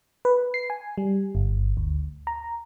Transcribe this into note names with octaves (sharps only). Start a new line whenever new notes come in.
B4
C7
G#5
G3
G1
D2
A#5